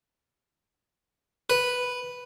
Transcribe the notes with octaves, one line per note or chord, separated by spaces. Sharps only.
B4